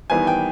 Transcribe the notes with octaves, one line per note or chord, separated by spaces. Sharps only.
E2 D#3 G3 B3 E4 G#5
G5